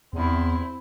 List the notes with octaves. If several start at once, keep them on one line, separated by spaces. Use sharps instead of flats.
E2 C4 E4